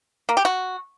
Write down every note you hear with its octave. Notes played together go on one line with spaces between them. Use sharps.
A#3
G4
F#4